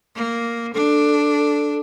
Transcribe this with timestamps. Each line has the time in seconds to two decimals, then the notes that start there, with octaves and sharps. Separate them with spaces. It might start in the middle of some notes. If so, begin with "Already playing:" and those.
0.16 A#3
0.74 D4 A4